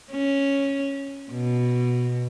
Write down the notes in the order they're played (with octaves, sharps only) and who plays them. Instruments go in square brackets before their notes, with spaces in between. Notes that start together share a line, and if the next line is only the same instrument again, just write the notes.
[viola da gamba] C#4
B2